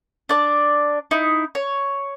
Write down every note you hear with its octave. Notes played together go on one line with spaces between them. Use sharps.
D4 D5
D#4 E4
C#5